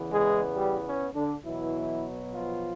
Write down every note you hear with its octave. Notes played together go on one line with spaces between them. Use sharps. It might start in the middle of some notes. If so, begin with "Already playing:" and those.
Already playing: E2 C#3 E3 B3
G#3 G#4
G3 G4
C#4
D3 D4
B2 E3 F#3 B3 E4
F3 F4